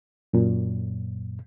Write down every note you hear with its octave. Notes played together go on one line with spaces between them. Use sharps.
F#2 A#2